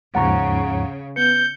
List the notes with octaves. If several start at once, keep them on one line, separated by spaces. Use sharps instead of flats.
D#2 G#2 C#3 F3 F#5 A#5 C#6
B3 B4 G6 C#7